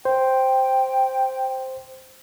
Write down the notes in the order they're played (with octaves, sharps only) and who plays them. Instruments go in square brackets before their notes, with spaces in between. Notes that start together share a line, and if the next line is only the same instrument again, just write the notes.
[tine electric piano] C5 [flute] G5